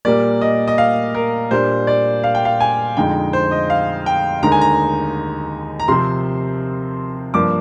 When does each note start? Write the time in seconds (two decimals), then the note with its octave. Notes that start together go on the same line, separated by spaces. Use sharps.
0.05 A#2 G3 A#3 D5
0.41 D#5
0.68 D#5
0.78 F5
1.14 A#4
1.51 A#2 G3 D4 C5
1.87 D5
2.24 F5
2.35 G5
2.45 F5
2.60 G#5
2.97 F2 D3 G#3 D#4 G5
3.33 C5
3.51 D#5
3.70 F5
4.06 G5
4.43 D#2 D3 G#3 D#4 A#5
4.52 G#5
4.61 A#5
5.80 A#5
5.88 C3 F3 C4 C6
7.34 G2 F3 A#3 D4 D6